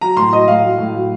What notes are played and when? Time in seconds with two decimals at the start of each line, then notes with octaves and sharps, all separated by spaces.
0.01 F#3 A#5
0.16 A2 C6
0.32 F#3 D#5
0.48 A2 F5
0.62 F#3
0.78 A2
0.94 F#3